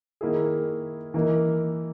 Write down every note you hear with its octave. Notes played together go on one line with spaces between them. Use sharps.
D#3 A#3 E4 G#4
E3 A#3 D#4 A#4